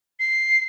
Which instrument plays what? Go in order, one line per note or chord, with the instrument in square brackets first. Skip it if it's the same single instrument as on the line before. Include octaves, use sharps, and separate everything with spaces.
[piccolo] C7